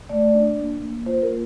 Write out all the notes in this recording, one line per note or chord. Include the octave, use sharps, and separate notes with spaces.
A3 D5
D4
A#3
A#3
F4 C5
A#4
A#3